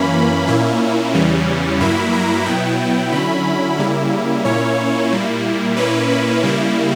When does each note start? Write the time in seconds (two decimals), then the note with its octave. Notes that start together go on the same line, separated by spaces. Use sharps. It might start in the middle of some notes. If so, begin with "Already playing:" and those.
Already playing: F#2 E3 A#3 C#4 B5
0.47 A#2 A#3 C#4 E4
1.14 E2 C#3 E3 G3 C#4
1.80 G2 F#3 A#3 E4 B5
2.13 A#5
2.46 B2 F#3 B3 E4 G5
3.12 D3 F#3 C#4 E4 B5
3.79 C#3 G3 A#3 E4
4.45 A#2 A#3 C#4 E4 C#5
5.11 A#2 G3 A#3 E4
5.76 A#2 A#3 C#4 E4 B4
6.43 C#3 G3 A#3 E4